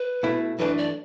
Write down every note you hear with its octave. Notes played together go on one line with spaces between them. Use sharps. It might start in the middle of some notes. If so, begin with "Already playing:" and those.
Already playing: B4
B2 A3 E4
F#2 E3 A3 D4 B4
D5